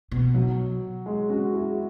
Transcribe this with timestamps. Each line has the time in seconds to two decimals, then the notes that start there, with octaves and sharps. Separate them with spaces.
0.11 B2
0.34 F#3
1.06 G#3
1.29 C#4 F#4
1.54 E4 G#4